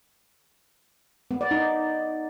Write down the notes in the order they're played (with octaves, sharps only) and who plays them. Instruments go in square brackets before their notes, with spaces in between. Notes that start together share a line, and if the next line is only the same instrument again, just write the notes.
[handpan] B3
D5
D#4